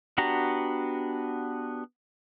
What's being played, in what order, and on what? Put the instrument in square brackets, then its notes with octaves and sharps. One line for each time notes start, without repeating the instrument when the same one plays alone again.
[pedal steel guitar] B3 D4 F#4 G4 A#5